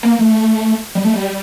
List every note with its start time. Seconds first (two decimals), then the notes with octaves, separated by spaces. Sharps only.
0.03 A#3
0.19 A3
0.95 G3
1.04 A3
1.14 G3